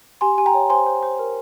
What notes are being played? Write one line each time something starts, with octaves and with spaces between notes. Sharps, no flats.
G4 G#5 C6
G4 G#5
G5 A#5
C#5
C5 G#5 C6
C5
C5
A#4